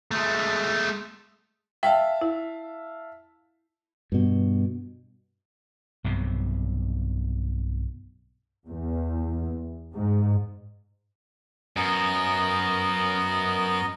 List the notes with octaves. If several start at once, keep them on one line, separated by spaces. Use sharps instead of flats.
G#3 A3
E5 F5 G5 A5
E4
G2 B2
B1 G2 C3
E2
G#2
F#2 B3 A#4 D#5